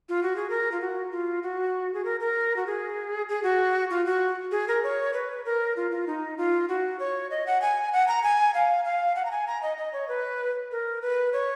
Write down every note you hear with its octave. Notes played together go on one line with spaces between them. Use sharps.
F4
F#4
G#4
A#4
F4
F#4
F4
F#4
G#4
A#4
A#4
F#4
G#4
G#4
F#4
F4
F#4
G#4
A#4
C#5
B4
A#4
F4
F4
D#4
F4
F#4
C#5
D#5
F#5
G#5
F#5
A#5
G#5
F5
F5
F#5
A#5
G#5
A#5
D#5
D#5
C#5
B4
A#4
B4
C#5